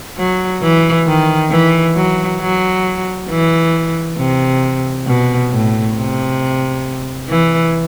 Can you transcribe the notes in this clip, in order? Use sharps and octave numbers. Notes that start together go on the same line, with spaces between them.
F#3
E3
D#3
E3
F#3
F#3
E3
C3
B2
A2
C3
E3